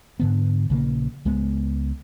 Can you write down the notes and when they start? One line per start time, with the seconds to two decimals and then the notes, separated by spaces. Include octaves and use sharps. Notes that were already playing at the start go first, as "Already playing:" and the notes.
0.20 G#2 D3 B3
0.70 A#1 C#3 E3 A#3
1.25 C#2 G#3 B3